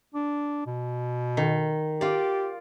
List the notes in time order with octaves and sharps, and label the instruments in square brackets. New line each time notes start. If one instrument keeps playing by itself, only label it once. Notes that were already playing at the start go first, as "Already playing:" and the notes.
[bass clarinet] D4
B2
[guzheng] D#3
[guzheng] F4 D5 [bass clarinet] G4